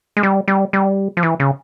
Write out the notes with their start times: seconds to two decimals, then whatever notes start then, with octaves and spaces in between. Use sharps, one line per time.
0.17 G#3
0.23 G3
0.48 G3
0.73 G3
1.17 F3
1.23 E3
1.40 C#3